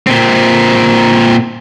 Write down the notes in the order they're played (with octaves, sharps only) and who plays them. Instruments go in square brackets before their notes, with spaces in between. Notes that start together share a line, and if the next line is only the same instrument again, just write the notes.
[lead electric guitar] A#2 C4